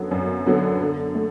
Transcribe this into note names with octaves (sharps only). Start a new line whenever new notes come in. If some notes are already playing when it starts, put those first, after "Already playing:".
Already playing: F#2 D3 F#3 B3
F#2
D3 F#3 B3
D3
A3